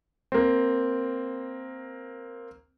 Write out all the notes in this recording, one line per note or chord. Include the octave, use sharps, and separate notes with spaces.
A#3 C4